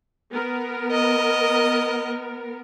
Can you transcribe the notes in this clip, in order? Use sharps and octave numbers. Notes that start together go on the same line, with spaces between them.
B3 A#4
D#5